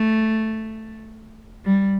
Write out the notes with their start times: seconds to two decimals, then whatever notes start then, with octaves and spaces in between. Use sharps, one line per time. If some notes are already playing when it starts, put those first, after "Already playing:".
Already playing: A3
1.65 G3